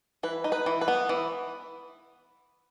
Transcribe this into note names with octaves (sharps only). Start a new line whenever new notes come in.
E3 B4
D#4
B4
E3
B4
B3
E3